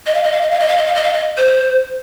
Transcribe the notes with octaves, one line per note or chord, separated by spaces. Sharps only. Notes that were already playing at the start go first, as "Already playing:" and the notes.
D#5
F5
D#5
F5
D#5
F5
D#5
F5
D#5
F5
D#5
F5
D#5
C5